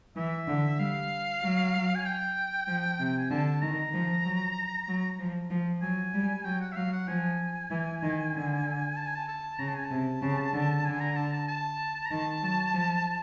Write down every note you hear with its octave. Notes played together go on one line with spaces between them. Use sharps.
E3 E5
D3
G3 F5
F#3
G#5
G5
F3
C3
G5
G#5
D3 A5
D#3 A#5
F3
F#3
F#3
F3
F3
F#3 G#5
G3
F#3 G5
F#5
E5
F#3 F5
F#5
F3 G#5
E3
D#3
D3
A5
G#5
A5
A5
C#3 A#5
A5
G#5
A5
C3
C#3
D3
D3 G#5
A#5
A5
A5
A5
A#5
D#3 A5
F#3
F3